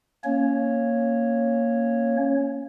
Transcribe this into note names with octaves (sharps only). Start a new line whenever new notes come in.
A#3 C#4 C#5